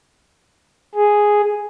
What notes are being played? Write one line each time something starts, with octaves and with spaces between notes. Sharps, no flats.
G#4